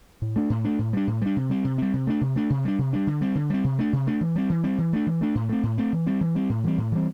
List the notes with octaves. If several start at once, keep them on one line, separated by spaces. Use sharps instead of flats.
A2
A3 D4
A2
A3 D4
A2
G3 D4
A2
G3 D4
C3
G3 C4
C3
G3 C4
C3
A3 D4
C3
A3 D4
C3
G3 D4
C3
G3 D4
D3
G3 C4
D3
G3 C4
C3
A3 D4
C3
A3 D4
E3
G3 C4
E3
G3 C4
E3
A3 D4
E3
A3 D4
A2
A3 C4
A2
A3 C4
E3
G3 C4
E3
G3 C4
A2
E3 G3 C4
A2
E3 G3 C4